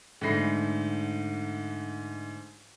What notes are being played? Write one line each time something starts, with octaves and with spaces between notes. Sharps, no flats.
G#2 D3 A3 B5 A#6 C7